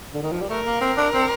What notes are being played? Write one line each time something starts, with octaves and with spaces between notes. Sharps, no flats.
D3
D#3
F3
G3
A3 A#4
A#3
C4
D4
C4